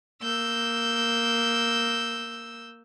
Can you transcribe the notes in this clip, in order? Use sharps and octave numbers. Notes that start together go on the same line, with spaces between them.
A#3 E6 G6